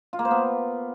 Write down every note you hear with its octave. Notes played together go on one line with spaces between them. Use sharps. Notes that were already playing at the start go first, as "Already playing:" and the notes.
F4
A#3
C5
B3